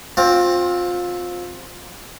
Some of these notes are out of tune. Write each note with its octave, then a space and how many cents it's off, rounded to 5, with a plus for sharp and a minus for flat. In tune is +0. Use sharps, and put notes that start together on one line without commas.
C4 +5 F4 +25